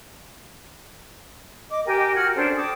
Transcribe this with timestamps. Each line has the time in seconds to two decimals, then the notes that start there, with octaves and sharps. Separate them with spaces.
1.71 D#5 D6
1.86 G4 A#4 G5 G#5
2.15 F#4 F6 G#6
2.35 C#4 D4 A4 C5
2.57 G5 A5 D6 D#6